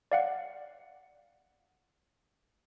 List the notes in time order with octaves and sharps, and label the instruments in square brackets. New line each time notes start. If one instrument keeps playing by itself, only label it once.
[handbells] D5 F5 F#5